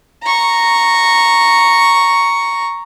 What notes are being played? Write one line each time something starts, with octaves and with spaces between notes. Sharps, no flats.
A#5 C#6